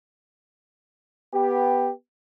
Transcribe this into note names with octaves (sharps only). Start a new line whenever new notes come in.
B3 G4